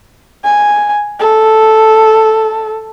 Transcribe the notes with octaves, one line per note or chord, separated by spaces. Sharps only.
G#5
A4